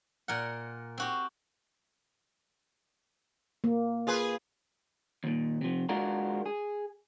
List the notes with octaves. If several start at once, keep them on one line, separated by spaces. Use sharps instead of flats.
A#2 A#4 F#5
C4 F#4 G4
A#3
F4 G#4 B4
D#2 A#2
C3 F3
G#3 D4 F4 F#4 G#4 A#4
G#4